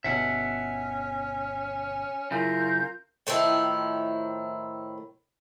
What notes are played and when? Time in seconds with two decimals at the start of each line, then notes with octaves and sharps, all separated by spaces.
0.04 G1 B2 C#4 E5 F#5
2.31 F#2 C#3 E4 F4 A#4 G6
3.27 A2 D#3 F3 E4